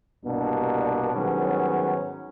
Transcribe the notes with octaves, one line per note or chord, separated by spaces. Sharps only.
C2 G2 B2 A#3 D4
G#2 D#3 F#3 G3 B3 C#4